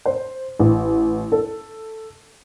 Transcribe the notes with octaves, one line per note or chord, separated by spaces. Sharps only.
C5
A1
A4